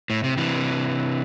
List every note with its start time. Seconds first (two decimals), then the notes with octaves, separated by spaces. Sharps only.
0.10 A2
0.24 C3
0.37 C3 E3